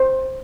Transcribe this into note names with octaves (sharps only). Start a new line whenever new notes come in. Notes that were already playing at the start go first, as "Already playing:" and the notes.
Already playing: C5